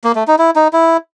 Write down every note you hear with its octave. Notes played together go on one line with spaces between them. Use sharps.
A#3
A3
D#4
E4
D#4
E4